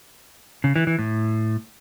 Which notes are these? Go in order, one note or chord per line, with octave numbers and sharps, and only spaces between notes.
C#3
E3
E3
A2